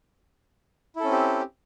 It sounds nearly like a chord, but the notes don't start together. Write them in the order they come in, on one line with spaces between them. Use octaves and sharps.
E4 A4 C#4 C4 G4